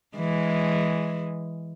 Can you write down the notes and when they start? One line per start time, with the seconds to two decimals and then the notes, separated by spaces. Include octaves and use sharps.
0.17 E3 G#3